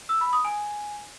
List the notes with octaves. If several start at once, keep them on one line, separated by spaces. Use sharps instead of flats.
E6
B5
D#6
G#5